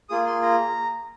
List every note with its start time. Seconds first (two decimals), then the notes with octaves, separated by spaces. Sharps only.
0.09 A#3 F4 G#4 D#6
0.27 C6
0.43 A#5